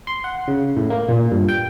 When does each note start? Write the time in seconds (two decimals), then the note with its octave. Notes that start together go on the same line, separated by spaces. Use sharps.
0.07 C6
0.24 F#5
0.48 C#3
0.77 A2
0.90 A#3
1.09 A#2
1.32 G2
1.49 G5